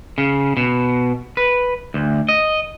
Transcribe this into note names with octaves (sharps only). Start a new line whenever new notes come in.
C#3
B2
B4
D2
D#5